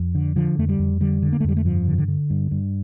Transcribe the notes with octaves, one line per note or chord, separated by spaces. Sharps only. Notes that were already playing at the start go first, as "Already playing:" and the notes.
Already playing: F2
D3
D3 F3
F2 A3
G3
F2
D3 G3
D3
A#3
A3
F2 G3
A3
G2 F3
D3
D3
D3
G2
G2